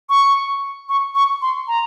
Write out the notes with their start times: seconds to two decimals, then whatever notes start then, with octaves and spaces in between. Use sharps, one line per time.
0.09 C#6
0.89 C#6
1.15 C#6
1.42 C6
1.68 A#5